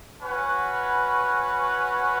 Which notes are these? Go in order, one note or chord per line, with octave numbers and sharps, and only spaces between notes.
C#4 F#4 B4 F#5